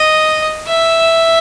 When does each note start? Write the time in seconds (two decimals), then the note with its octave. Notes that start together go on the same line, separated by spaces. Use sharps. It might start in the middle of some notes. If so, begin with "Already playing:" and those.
Already playing: D#5
0.68 E5